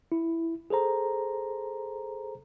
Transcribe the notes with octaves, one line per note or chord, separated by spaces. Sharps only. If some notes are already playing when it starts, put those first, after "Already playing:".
E4
G#4 A4 C5 A#5